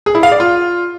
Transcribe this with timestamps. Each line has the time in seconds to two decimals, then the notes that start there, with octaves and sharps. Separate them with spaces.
0.06 G#4
0.15 E4
0.23 F5
0.32 D5
0.40 F4